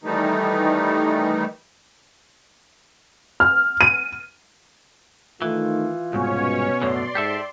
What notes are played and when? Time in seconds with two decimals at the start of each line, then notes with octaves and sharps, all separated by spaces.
0.04 D#3 E3 G3 A3 D#4
3.40 F6
3.81 D#7
5.42 D#3 E3 A3 F4
6.13 C2 G#2 B2 C#4 C#5
6.82 F#2 A2 D3 D5 C6
7.15 G#2 G4 A4 E5